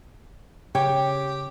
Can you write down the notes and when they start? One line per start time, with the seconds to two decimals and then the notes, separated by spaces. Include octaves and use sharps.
0.75 C#3 G4 C#5 G5